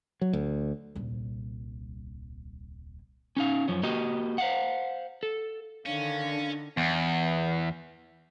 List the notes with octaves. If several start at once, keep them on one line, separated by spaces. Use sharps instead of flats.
F#3
D2
D#1 C2
C#4 D#4 F5
F#2 F3 C#4
A#3 F#4 G4 D#5
C5 F5 F#5
A4
D3 D#3 C#4 D4 F5
E2